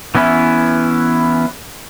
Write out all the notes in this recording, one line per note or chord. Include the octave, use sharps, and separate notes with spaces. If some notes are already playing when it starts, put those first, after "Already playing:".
E3 B3 C#4 E4